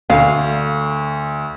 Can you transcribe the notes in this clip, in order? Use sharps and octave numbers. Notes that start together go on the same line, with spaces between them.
D2 F5